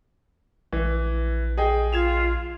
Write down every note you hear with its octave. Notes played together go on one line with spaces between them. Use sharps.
A#1 E3
G#4 D#5 G5
F4 G#6 E7 F7